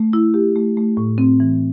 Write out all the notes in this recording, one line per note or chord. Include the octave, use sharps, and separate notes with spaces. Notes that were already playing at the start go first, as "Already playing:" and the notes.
Already playing: A3
E4
G4
A3
A3
A2
C4
E3